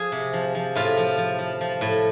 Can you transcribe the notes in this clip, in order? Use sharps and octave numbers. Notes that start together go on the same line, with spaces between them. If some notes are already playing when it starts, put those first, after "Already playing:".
Already playing: F3 G#4
C3
F3
F3
A2 F4
F3
F3
F3
F3
A2